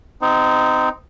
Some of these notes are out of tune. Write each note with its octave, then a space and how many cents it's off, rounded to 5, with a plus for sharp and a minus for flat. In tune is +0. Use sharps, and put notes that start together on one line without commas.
C4 -30 D#4 +0